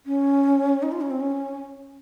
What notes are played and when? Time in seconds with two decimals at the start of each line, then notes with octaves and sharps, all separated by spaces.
0.06 C#4
0.82 D#4
0.92 F4
1.01 C#4
1.11 C4
1.20 C#4